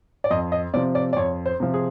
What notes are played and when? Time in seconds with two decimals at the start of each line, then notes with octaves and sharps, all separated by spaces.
0.24 D5
0.31 F2 D#5
0.52 D#5
0.74 C3 F3 D5
0.95 D5
1.13 D5
1.17 F2 C#5
1.46 C5
1.60 C3 F3
1.74 G#4